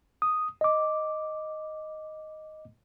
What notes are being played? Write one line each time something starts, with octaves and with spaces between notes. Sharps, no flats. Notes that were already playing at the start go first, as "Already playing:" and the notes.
D#6
D#5 D6